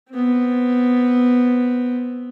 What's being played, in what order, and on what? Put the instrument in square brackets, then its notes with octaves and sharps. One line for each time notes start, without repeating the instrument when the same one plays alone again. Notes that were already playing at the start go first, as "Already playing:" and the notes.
[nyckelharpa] B3 C4